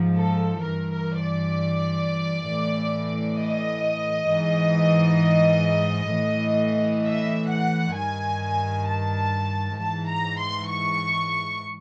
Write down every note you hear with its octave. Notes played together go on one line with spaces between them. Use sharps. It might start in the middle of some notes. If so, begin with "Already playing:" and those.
Already playing: G#2 F3
A4
G2 E3 A#4
A#4
D5
A2 E3
D#5
G#2 E3
A2 E3
E5
F#5
G2 D#3 G#5
A5
G#2 E3 A5
A#5
C6
C#6